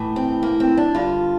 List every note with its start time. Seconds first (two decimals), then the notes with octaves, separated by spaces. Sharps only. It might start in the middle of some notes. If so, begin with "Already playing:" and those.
Already playing: A2 E3
0.16 C4
0.43 A#3
0.60 C4
0.77 D4
0.94 G2 D3 F4